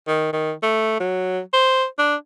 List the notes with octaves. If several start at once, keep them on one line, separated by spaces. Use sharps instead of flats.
D#3
D#3
A3
F#3
C5
D4